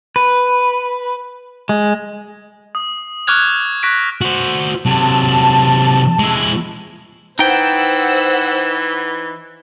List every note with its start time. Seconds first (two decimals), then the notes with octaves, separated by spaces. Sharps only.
0.16 B4
1.69 G#3
2.75 D#6
3.27 C#6 D6 F6 F#6 G#6 F7
3.83 C#6 F#6 A#6 B6 D7
4.21 F#4 C5
4.86 C3 F#3 A5
6.19 G#3 E4
7.39 E3 D#4 C5 F#5 G5 E6